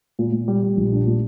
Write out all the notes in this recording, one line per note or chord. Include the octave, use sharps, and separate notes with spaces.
A#2
A#2
G3
G3
A#1
D4
A#2